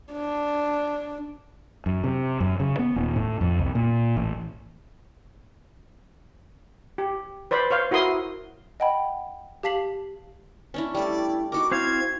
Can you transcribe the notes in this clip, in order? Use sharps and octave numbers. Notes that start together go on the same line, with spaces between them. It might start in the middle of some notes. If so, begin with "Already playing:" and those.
D4
F#2
C3
F#2
C#3
B3
D#1
A2
F2
C2
A#2
A1
G4
B4 C5 D5 B5
C5 C#5 F5
E4 F#4 A#4 C6 D#6
D#5 F#5 G5 A5 B5
G4 F5 A5 B6 C7 F#7
C#4 D4 E4
G3 A3 E4 D5
D#4 F#4 A#4 D6
C4 E4 C5 F5 G#6